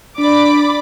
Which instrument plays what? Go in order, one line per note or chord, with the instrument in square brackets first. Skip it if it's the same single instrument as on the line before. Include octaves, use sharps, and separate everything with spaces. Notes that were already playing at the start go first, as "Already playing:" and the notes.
[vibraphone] D4 [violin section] D5 B5 D6